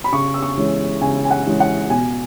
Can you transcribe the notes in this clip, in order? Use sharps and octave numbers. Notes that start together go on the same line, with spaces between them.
B5
C#3 C#6
E6
C#6
E3 G#3 C#4
C#3 G#5
G#5
F#5
E3 G#3 C#4
F#5
B2 G#5